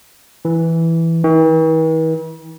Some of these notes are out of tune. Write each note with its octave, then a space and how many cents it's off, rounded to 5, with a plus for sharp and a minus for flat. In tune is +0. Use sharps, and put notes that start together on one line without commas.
E3 +0
E3 -45